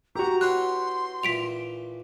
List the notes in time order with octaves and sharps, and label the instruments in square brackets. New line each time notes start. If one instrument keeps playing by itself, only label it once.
[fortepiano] F#4 G4 [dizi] A#5
[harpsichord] B3 E4 C#5 [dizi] C6 [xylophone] F#6
[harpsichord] A#1 E3 [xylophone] B6 D7 F7